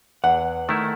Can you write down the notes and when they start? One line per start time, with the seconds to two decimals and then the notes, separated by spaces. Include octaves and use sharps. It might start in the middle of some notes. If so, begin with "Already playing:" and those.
0.24 E2 F#5
0.69 D#3 A3 E4